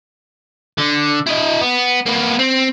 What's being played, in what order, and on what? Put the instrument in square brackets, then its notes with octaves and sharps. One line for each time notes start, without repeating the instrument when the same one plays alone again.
[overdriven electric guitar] D3
E4 D#5
B3
A#3 B3
C4